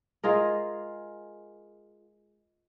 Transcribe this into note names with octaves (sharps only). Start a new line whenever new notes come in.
G#3 F4 G#4 A#4